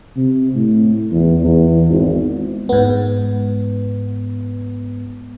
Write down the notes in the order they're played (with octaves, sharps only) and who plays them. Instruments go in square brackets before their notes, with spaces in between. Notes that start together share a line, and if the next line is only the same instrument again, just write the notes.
[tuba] C3
A2
E2
E2
G#1
[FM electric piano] G#2 B3